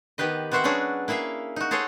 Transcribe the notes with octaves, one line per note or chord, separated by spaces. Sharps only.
D#3 B3 G4 B4 D#5
B3 C4 F#4 C5 E5 F#5
F#3 C#4 D4 F#4 G#4
A#3 E4 G#4 E5 F5
D#4 F#4
G#4 A4 C5 C#5 D#5